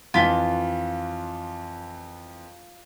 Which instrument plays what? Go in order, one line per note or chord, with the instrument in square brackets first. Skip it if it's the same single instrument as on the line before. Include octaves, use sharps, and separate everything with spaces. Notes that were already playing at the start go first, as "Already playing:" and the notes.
[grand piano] F2 E3 B6 [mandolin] F4